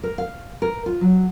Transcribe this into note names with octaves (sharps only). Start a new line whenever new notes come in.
A#4
F5
A#4
F4
F#3